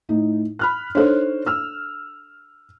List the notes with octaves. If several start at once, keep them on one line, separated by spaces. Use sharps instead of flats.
A2 D#4
B5 F6 F#6
D4 D#4 A4 C5 C#5
E6 F6